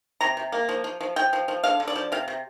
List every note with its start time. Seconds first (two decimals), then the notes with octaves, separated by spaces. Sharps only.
0.21 C3 A#5
0.37 C3
0.52 A#3
0.69 F3
0.84 F3
1.01 F3
1.16 F3 G5
1.33 F3
1.48 F3
1.63 D3 F5
1.80 D3
1.88 D5
1.96 F3
2.12 C3 F5
2.28 C3